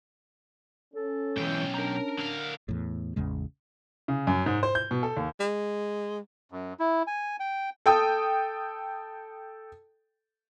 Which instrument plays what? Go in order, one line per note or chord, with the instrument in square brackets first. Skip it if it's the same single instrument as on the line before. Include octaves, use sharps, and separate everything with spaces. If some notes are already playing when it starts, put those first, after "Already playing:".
[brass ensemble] C#4 [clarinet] A4
[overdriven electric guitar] B1 G5 [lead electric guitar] G#2 E3
[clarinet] D4 [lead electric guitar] A#4 A#5
[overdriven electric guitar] D3 F5
[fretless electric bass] E2 A2
A1 E2 C#3 G#3
[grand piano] C#3
F#2
G#2
C5
G6
B2
A4
D#2
[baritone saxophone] G#3
[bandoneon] F#2
E4
G#5
G5
[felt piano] A4 G5 D#6